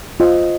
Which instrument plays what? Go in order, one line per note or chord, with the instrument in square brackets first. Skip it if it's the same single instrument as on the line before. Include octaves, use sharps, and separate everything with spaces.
[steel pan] F4 [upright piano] C5 D#5